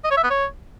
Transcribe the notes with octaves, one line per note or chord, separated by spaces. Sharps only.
D#5
C#5
E5
B3
C#5